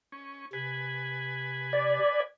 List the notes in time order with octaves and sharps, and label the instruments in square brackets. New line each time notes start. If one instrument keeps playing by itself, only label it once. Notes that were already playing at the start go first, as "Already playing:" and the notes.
[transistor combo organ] C#4
[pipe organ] C3 [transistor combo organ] B4 G#5
[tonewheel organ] D5